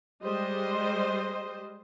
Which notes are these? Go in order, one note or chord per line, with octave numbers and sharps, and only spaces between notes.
G3 G#3 C5 D#5